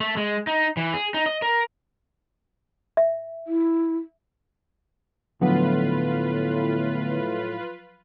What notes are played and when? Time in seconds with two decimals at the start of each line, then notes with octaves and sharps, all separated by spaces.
0.01 A3
0.17 G#3
0.47 D#4
0.77 E3
0.94 G#4
1.14 D#4
1.26 D#5
1.42 A#4
2.97 E5
3.47 E4
5.41 A2 D3 F3 F#3 B3 F4 B4